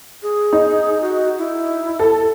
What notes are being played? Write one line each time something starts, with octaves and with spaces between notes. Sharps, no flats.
G#4
D#4
F#4
E4
A4